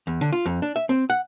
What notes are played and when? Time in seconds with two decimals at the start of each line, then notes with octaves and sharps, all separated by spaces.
0.07 E2
0.21 D3
0.33 F4
0.46 F2
0.62 D4
0.76 E5
0.89 C4
1.10 F#5